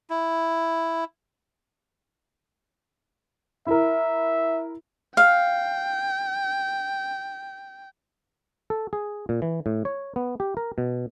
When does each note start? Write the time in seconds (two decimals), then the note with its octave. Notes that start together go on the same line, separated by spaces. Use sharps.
0.10 E4
3.67 E4 A#4 E5
5.17 F5 G5
8.70 A4
8.93 G#4
9.29 A#2
9.42 E3
9.66 A2
9.85 C#5
10.16 B3
10.40 G4
10.57 A#4
10.78 B2